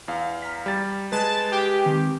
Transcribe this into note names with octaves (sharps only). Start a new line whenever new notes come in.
E2 F5
A#5 F6 B6
G3 A6
G#3 B4 A5
G4
D#3 C4